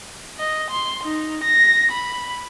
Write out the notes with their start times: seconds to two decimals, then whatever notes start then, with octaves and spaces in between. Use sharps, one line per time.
0.39 D#5
0.71 C6
1.04 D#4
1.44 A#6
1.91 B5